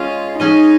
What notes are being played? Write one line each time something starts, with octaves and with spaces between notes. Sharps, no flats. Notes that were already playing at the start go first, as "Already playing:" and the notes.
Already playing: G#3 C#4 F4 G#4 D#5
G#3 C#4 D#4 G#4 D#5